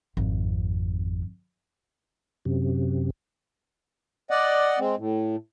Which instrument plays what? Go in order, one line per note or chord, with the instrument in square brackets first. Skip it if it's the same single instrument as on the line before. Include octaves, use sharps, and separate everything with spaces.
[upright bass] G#1 F2
[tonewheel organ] F#2 C3
[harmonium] D5 D#5 F#5
G#3 C4
A2